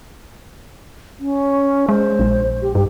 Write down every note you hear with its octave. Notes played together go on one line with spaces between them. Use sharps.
C#4
G#3 C5
A#1
G4
G2 G4